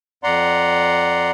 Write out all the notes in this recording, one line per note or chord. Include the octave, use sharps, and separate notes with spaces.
F2 D5 F#5 A#5 C6